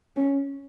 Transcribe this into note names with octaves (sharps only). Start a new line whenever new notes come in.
C#4